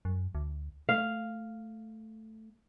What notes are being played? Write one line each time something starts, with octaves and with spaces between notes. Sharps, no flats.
F#2
D2
A3 F5